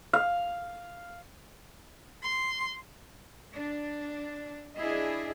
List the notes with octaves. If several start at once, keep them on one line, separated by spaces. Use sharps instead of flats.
F5
C6
D4
D4 E4 G#4 D#5